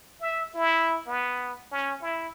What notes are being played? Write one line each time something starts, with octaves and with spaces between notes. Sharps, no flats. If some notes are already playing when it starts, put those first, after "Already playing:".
E5
E4
B3
C#4
E4